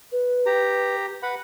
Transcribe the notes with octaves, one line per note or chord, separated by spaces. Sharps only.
B4
G4 A#5
B4 F#5 B5